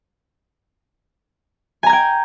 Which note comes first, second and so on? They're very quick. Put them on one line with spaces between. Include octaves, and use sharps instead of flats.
G#5 A#5 G#6 G5